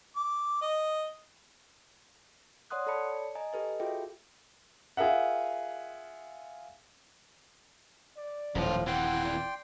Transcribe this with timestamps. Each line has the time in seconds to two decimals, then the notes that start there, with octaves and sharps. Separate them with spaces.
0.16 D6
0.61 D#5
2.70 C#5 D5 F#5 C6 D#6 F#6
2.87 A4 C#5 D5 A5 B5 C#7
3.35 D#5 G#5 A#5
3.53 G4 A4 B4 D#5
3.80 F4 F#4 G#4 A4 E5 G5
4.97 F4 G#4 A#4 E5 F#5
8.17 D5
8.55 D#1 F#2 A2 F3 F4
8.87 F2 E3 F#5 G5 C6
9.25 D5